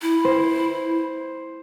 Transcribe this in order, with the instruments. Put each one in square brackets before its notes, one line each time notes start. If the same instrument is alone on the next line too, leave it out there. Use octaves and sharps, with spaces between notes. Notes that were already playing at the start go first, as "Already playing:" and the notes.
[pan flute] E4
[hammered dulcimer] C5